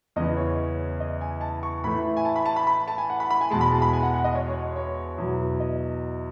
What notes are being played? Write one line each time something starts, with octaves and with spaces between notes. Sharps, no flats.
E2 C#3 E3 D#5
C#5
D#5
G#5
A5
C#6
A2 E3 A3 B5
G#5
A5
B5
A5
B5
B5
A5
G#5
F#5
B5
B5
G#5
E2 B2 G#3 A5
B5
A5
B5
G#5
F#5
F#5
D#5
C#5
C#5
C#5
E2 B2 F#3
D#5